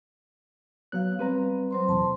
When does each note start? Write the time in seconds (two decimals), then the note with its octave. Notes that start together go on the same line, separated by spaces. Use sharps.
0.92 F#3 B3 C#5 F5 F#6
1.19 G3 C4 B4 A#5
1.71 F#3 C5 C6
1.89 E2 B2 A5 C6